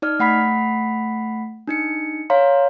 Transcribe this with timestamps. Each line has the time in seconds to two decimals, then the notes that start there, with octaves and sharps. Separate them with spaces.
0.02 D#4 D5 F6
0.19 A3 F#5 B5 B6
1.68 D4 D#4 C#7
2.30 C#5 F5 A#5 C6